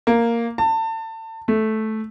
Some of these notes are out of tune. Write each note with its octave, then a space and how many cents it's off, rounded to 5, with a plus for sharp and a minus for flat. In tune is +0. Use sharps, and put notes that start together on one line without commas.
A#3 -5
A5 +30
A3 -10